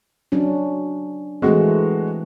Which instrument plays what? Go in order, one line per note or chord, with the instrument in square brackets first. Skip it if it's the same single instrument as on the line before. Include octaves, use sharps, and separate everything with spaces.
[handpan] F#3 C#4 D4
[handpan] E3 A3 C4 [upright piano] G#3 F#4